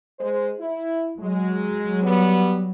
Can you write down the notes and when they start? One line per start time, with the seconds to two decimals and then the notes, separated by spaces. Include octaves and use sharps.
0.20 G#3 C5
0.59 E4
1.19 F#3 G#3
2.04 G3 B3